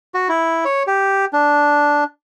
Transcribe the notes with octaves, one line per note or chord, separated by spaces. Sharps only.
F#4
E4
C#5
G4
D4